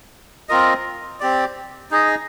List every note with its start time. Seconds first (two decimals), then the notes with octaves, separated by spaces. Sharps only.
0.49 C4 F4 A#4 D#5
1.20 C4 G4 D5
1.91 D#4 G#4 D#5